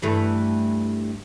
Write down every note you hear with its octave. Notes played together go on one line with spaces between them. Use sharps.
G2 E3 A3